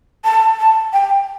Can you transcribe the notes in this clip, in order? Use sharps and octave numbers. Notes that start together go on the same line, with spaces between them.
A5
A5
G5